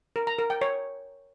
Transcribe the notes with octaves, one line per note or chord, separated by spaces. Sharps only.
A#4
A#5
A#4
G5
C#5